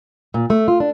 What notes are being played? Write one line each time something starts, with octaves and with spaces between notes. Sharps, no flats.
A#2
A3
F4
D4